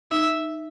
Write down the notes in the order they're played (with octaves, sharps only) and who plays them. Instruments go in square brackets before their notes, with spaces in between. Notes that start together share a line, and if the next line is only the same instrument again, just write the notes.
[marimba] D#4 [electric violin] E5